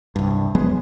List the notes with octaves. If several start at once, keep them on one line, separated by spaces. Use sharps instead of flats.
C2 G2
F1 F#3 G#3 B3